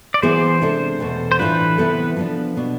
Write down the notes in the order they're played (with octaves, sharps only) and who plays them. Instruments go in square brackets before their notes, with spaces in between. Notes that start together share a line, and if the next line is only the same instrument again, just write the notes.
[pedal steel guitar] D5
[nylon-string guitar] E3 B3 E4 G#4 [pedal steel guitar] C5
[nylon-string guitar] C3 G#3 D4 A4
E2 B2 A3
[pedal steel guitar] C5
[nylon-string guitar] A2 E3 A3 D4 F4 [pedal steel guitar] B4
[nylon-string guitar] C3 E3 B3 E4 A4
F3 B3 D4
B2 B3 D4